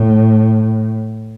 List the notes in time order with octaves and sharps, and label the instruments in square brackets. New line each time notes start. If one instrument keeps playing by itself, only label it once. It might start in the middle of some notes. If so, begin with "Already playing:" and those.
Already playing: [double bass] A2